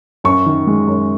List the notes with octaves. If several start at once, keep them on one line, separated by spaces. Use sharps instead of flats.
F#2 C#6
D#3
G#3
F#2